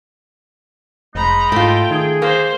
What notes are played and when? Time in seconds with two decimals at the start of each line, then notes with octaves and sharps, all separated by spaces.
1.15 F1 G#3 D#4 A#5 B5
1.52 G#2 A3 F4 G5
1.91 D#3 G#4
2.22 A#3 C5